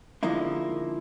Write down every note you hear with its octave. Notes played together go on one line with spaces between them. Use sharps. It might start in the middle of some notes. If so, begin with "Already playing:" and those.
D3 F3 G#3 A#3 D#4 E4